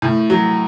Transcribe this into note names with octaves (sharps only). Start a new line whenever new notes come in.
A2
F#3